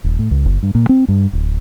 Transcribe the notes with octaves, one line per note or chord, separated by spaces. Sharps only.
D#1
A2
C#2
F#1
G2
A#2
C4
G2
D1